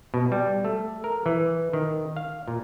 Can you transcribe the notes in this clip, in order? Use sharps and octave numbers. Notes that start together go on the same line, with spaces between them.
B2
G3
A3
A#4
E3
D#3
F5
A#2